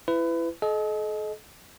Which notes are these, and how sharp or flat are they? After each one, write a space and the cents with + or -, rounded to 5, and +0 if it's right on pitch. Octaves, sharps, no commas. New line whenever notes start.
E4 +20 B4 +25
A4 -45 D#5 +0